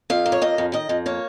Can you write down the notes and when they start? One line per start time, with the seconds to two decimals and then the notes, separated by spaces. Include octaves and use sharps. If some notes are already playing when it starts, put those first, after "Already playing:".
0.10 F2 F5
0.26 A#3
0.32 C#5
0.42 F2 D#5
0.58 F2
0.73 D#3 D#5
0.89 F2
1.06 A#3 C#5